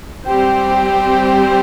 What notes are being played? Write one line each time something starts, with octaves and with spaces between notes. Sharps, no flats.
G3 C4 G4 C5 G5